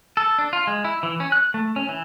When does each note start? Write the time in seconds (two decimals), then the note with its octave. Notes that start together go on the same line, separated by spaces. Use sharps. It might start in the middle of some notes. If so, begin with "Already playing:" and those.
0.17 A4
0.38 D4
0.53 F4
0.67 G#3
0.84 E4
1.03 E3
1.20 C#4
1.32 F#6
1.54 A3
1.76 C#4
1.89 E3